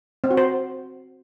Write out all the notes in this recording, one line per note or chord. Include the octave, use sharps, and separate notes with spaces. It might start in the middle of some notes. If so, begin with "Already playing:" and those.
C4
F#4
C5